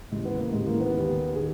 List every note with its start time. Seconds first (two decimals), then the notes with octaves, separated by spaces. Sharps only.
0.12 D#2 C#3 E3 G#3
0.25 B3
0.39 A#3
0.52 D#2 C#3 E3 G#3
0.67 A#3
0.80 B3
0.93 D#2 D#3
1.35 D#3 G#4